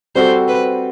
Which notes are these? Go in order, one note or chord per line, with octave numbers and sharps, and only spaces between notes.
G3 C4 F#4 A4 C5
B4